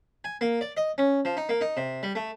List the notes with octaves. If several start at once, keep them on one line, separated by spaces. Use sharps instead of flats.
G#5
A#3
D5
D#5
C#4
F3
D#4
A#3
D#4
C3
G3
A3